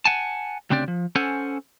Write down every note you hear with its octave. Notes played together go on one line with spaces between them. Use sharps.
F#5 G#5 A5
D2 C#3 C4 D4 G4 D5
F3
C#4 A4 C5 F#5 G#5